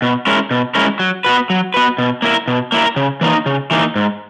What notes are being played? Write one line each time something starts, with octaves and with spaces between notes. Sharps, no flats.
B2
G#3 C#4 E4 A#4
B2
G#3 C#4 E4 A#4
F#3
B3 F#4 B4
F#3
B3 F#4 B4
B2
A#3 E4 A#4
B2
A#3 E4 A#4
C#3
E3 A#3 D#4
C#3
E3 A#3 D#4
G#2